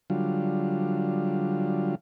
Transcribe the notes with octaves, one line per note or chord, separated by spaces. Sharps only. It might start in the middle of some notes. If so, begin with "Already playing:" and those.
D3 F#3 G3 F4